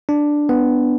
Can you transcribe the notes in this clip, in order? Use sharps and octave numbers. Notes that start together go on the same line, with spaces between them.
D4
B3